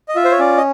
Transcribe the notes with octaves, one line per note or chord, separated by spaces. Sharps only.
D#5
F4 E5
C5
C#5
C#4 D5
D#5